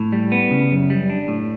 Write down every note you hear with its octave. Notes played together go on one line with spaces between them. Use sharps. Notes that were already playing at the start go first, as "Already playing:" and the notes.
Already playing: A2
G3
B3
C#3
F#2
G3
D4
A2